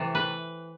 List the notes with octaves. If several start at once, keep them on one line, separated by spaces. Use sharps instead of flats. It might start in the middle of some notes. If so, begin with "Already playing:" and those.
Already playing: C3 E3 A3
B4